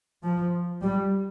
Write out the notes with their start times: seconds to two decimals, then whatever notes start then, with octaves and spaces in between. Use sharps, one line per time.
0.23 F3
0.82 G3